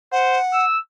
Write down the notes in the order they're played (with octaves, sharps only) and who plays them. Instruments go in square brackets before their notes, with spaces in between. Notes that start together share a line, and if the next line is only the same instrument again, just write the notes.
[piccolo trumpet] C5 [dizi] F#5
[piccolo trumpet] E6